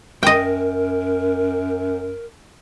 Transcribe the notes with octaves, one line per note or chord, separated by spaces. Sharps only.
F#2 A#4 D#5 G5